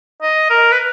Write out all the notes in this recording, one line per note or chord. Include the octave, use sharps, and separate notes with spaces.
D#5
A#4
B4